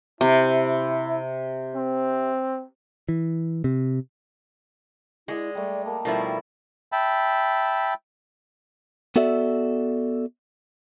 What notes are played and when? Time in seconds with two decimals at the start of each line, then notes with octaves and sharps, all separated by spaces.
0.21 C3 E4
1.75 C4
3.09 E3
3.64 C3
5.28 G#3 E4 D5 D#5 F#5
5.55 G3 A3 D5
5.86 A#3 A5
6.05 B2 D#3 F3 G3 A3 E4
6.92 E5 G5 A5 B5
9.16 B3 F#4 A4 D5 E5